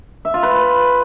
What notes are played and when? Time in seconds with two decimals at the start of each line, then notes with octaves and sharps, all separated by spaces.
0.25 E5
0.34 F4
0.43 B4